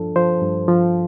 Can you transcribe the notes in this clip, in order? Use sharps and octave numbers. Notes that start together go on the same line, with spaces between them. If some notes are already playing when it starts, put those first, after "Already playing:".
Already playing: G2 F3 D4 A4
F3 C5
G2
F3